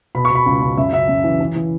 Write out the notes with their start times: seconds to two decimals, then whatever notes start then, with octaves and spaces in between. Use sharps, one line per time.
0.15 B2 B5
0.25 C#6
0.30 B2
0.35 B5
0.46 C#2
0.62 C#2
0.77 F#2 E5
0.92 C#3 E5
1.08 F#2
1.24 E3
1.40 E3
1.56 E3